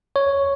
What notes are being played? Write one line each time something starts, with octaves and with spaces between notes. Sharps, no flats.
C#5